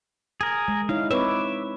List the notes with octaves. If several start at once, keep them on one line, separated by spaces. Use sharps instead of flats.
G#4 A#4
G#3
D#4 E4 C#5 F5
C4 B4 C#5 E5 D6